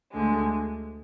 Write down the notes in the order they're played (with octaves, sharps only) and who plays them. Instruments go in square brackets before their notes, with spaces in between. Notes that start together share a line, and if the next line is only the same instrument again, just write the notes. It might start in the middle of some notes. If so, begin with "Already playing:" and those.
[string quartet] D2 D3 G#3